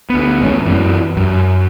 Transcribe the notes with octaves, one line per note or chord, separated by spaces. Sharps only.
D2 B3
A1 G#3 C4 C#4
F#2 E3
F#2